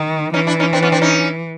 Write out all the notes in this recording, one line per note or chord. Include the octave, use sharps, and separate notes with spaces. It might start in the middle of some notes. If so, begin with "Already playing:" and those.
Already playing: D#3
E3 C#4 D#4
D4 E4
C#4 D#4
C4 D4
B3 C#4
C4 D4
C#4 D#4